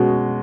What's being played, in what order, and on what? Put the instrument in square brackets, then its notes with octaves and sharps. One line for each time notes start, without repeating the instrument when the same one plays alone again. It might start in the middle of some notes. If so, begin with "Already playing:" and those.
Already playing: [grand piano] B2 G#3 C#4